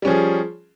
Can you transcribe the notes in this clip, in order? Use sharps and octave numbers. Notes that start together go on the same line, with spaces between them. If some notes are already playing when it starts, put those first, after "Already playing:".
F3 G3 C#4 G#4